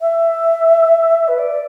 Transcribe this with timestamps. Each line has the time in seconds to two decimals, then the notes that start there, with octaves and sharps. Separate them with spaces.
0.01 E5
1.28 B4
1.38 D5